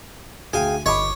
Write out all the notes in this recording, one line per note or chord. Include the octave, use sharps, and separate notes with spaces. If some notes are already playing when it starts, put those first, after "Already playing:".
D2 G#4 F5 G5 G#5
G1 C#5 D#5 B5 D6